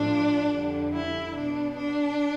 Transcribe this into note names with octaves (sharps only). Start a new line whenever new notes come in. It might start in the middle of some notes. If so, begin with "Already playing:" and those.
Already playing: A2 F3 D4
F2 D3 G3
E4
B2 G3 D4
D4